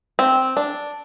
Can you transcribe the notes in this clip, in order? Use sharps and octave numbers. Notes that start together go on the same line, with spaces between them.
C4
D4